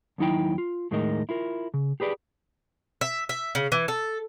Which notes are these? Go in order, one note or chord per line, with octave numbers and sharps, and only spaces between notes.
D#2 F#3 D#4 E4 G5
F4
D#2 A2 G#3 D#4 A#4 D#5
E4 F4 A#4
C#3
G4 G#4 B4 D5
E5
E5
C#3
E3
A4